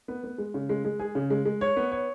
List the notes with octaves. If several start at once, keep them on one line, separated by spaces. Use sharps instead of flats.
B3
B3
G#3
C#3
G#3
G#3
G#4
C#3
G#3
G#3
C#5
B3
C#5